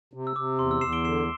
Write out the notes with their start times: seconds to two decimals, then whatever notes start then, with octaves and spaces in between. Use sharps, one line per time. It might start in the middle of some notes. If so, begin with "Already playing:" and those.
0.13 C3
0.27 E6
0.36 C3 D6
0.59 E2 C6
0.71 E6
0.81 E2 C7 E7
0.93 D7 G7
1.04 D3 C7 E7